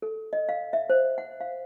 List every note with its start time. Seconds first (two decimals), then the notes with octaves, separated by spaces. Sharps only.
0.02 A4
0.33 D#5
0.49 F5
0.73 E5
0.90 C5
1.18 F#5
1.41 F5